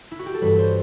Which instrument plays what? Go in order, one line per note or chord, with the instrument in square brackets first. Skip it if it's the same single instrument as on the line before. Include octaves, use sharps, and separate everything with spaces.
[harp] E4
F#4
G4
A4
G2 E3 G3 B4
C5